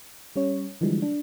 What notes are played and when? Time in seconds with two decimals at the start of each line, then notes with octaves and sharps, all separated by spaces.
0.36 G3 C#4 C#5
0.81 D3 E3 F3 G3 G#3
1.02 D4